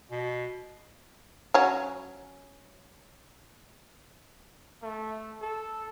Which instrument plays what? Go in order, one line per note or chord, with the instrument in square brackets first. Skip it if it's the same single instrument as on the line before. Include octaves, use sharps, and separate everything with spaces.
[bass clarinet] B2
[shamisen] F#3 C#4
[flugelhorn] A3
A4